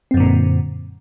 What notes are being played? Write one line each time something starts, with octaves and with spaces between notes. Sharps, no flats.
F#2 A#2 D3 C4